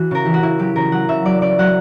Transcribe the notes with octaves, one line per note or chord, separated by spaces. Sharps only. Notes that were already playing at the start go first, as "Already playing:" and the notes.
Already playing: E3 F#4
C#3 A#4
E3 G4
F#4
C#3 E4
F#3 G4
C#3 A#4
F#3 F#5
C#3 E5
F#3 D5
C#3 D5
F#3 F#5